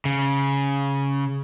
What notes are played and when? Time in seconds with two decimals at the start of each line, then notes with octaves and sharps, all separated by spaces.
0.05 C#3